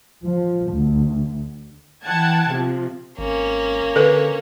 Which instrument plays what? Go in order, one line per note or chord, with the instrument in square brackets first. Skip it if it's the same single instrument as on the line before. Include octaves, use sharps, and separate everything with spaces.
[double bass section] F3
D2
[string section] E3 F#5 G5 A5 G#6
C3 F3
[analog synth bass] G#1 [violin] A#3 C#4
[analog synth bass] D3 [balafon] A4 B4